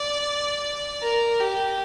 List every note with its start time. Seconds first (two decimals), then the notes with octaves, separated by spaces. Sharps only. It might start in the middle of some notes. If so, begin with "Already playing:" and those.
Already playing: D5
1.02 A#4
1.40 G4